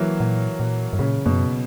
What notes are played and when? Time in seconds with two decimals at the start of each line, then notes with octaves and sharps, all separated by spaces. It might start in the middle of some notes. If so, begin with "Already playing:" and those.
Already playing: E3 F#3 A#3
0.20 A#2
0.60 A#2
0.93 G2
0.99 A#2 C#3
1.26 F#2 B2